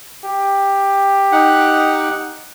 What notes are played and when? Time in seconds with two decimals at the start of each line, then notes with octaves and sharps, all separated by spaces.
0.25 G4
1.32 D#4 F#5